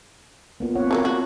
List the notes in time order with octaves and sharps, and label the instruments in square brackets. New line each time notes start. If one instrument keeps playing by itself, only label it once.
[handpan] A#3 B3 F4
C4 C#5 F#5
[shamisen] F3 F#3 A#3
F#4